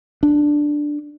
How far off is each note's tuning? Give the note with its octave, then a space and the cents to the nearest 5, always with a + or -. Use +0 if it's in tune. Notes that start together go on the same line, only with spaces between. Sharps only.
D4 +5